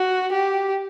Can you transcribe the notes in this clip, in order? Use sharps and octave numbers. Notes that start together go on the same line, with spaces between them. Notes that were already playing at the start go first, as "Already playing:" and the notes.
Already playing: F#4
G4